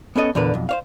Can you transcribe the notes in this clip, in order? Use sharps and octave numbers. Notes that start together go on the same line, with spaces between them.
B3 C#4 A4 D#5
E2 A#2 D3 A#4 B4
B1 F2
C5 C#5 F5